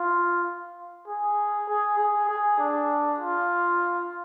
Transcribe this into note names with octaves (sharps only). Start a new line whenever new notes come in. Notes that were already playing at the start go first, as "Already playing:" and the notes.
Already playing: F4
G#4
G#4
G#4
G#4
D4
F4